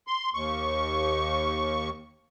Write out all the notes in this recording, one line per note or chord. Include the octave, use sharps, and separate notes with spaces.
C6
D#2 C#6